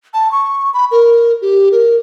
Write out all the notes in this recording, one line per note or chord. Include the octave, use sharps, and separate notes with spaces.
A5
C#6
B5
A#4
G4
A#4